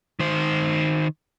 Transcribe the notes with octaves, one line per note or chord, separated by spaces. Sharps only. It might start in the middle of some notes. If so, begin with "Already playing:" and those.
D#3 C5